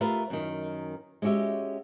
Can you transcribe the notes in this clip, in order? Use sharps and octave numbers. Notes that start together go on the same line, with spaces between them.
A3 F4 G4 A#4 B4 F5
F#2 D#3
G#3 C#4 F#4 G4 E5